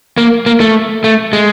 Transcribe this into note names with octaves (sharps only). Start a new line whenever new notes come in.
A#3
A#3
A3
A3
G#3